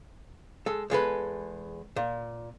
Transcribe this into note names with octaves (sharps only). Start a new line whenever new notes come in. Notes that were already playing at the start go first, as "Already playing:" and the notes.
G#3 A4
E2 G#3 A4 B4
A#2